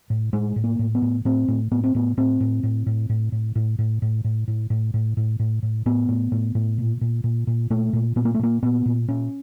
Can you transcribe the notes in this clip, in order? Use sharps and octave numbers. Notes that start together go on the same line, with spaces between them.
A2
A2 G#3
A2
A#3
A2
B3
A2
A2 C4
A2
A2 B3
C4
A2 B3
A2 C4
A2
A2
A2
A2
A2
A2
A2
A2
A2
A2
A2
A2
A2
A2
A2
A2 B3
A2
A2
A2
A#2
A#2
A#2
A#2
A#2 A3
A#2
A#2 B3
A#3
A3
A#2 A#3
A#2 B3
A#2
A#2 C#4